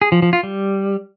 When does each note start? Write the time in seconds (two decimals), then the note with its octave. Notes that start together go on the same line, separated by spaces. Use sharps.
0.02 G#4
0.12 F3
0.22 F3
0.33 F4
0.43 G3